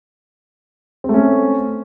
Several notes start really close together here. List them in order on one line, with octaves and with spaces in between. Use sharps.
C4 A3 C#4